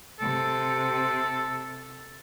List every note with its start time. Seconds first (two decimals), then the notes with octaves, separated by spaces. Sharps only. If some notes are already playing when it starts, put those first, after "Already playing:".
0.20 C3 A4